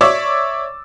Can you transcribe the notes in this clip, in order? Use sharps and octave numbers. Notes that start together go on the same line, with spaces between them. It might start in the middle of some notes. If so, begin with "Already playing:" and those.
C#5 D5 E5 C#6 D6 E6